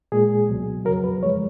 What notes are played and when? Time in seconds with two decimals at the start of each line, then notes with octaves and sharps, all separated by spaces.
0.12 A#2 G#3 G#4
0.49 C#2 B2 F#3
0.85 F2 C#3 F#3 A#4
1.04 B4
1.22 F#2 F3 G#3 C#5